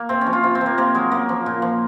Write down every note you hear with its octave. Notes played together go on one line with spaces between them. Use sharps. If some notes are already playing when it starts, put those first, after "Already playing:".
Already playing: A#3
C3 C4
C#4
F3
F4
C3 F4
C4
F3
A#3
C3 A#3
F#3 G#3
C#3 A#3
F3
A#2
F3